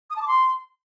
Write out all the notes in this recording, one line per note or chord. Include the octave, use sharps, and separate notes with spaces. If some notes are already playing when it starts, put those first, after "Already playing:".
D#6
A5
D6
C6